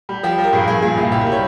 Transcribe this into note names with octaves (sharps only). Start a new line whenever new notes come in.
G3
F3 G4
F3
A#4
G2 G#4
G2 G#4
A#2 G#4
C2 F4
C2 G4
A#4
G3
C#5